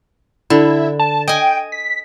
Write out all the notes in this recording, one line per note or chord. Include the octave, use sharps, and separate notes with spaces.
D3 E4
A5
D#5 G5 G#5
B6